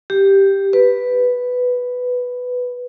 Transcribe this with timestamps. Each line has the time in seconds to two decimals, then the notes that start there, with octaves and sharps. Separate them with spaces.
0.10 G4
0.73 B4